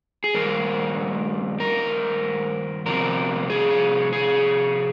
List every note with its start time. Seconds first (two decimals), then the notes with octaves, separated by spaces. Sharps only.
0.24 G#4
0.34 G2 D#3 A#3 A#4
1.60 A#4
2.86 C3 F3 C4 A#4
3.50 G#4
4.13 G#4